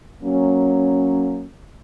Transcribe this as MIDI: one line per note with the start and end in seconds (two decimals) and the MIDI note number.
0.22 1.47 54
0.22 1.47 58
0.22 1.47 61